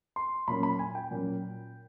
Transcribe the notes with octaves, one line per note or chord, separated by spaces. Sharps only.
C6
A#2 F#3 A#3 C#4 B5
B5
G#5
G5
A#2 F#3 A#3 C#4